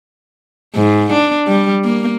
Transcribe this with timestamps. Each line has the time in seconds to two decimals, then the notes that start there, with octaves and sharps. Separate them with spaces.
0.76 G#2
1.13 D4
1.48 G3
1.84 A#3